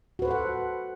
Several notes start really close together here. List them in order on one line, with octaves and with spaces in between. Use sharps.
F#4 B4 C5 A4 F#5